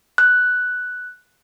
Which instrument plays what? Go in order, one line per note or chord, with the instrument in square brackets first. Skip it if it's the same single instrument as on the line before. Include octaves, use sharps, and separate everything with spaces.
[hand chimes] F#6